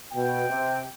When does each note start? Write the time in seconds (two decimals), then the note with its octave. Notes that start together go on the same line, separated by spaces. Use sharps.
0.12 B2 G5
0.46 C3